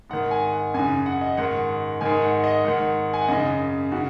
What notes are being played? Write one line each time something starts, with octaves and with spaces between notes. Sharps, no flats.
G#2 D#3 F#5
G#5
F#5
F#2 C#3 G#5
F#5
D#5
G#2 D#3 F#5
G#2 D#3 G#5
F#5
D#5
G#2 D#3 F#5
G#5
F#5
F#2 C#3 D#5
C#3 F#4